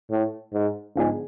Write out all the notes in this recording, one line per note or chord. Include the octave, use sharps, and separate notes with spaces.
A2
G#2
G#2 D3 F3 B3 D4 G#4